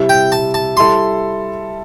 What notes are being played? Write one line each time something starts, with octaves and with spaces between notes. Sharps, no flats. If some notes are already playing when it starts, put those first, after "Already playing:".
Already playing: C3 G3 E4
G5
A5
A5
G3 E4 A4 C6